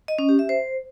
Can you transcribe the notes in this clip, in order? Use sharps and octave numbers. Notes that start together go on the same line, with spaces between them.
D#5
C#4
G4
E5
C5